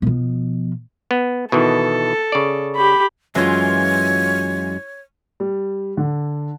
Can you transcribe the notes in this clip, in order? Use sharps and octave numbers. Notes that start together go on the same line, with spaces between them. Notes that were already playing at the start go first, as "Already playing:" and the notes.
B2 F3
B3
B2 D#3 E3 A4
C#3 D5
G4 B5
F#2 E3 G#3 F4 C#5
G3
D3